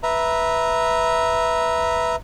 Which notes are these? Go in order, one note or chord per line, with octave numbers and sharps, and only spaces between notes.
B4 E5 A#5